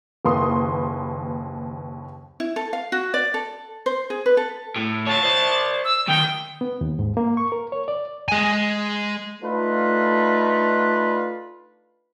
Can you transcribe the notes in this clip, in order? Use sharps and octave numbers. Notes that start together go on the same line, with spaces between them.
F#1 D#2 B4 C6 D#6
E4
A4
F5
F#4
D5
A4
C5
G#4
B4
A4
A2
F4 C#5 A5
C5 D5
E6
B1 D#3 G5
B3
D#2
G#2
A#3
C#6
A#4
C#5
D5
G#3 G#5
A3 D4 D#4 F4 B4